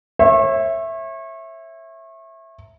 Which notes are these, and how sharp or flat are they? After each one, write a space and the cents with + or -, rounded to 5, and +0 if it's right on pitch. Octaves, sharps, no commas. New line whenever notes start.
C#5 -35 E5 +0